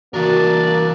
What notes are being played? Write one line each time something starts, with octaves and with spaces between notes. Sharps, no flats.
E3 A#3 D4 F#4 A#4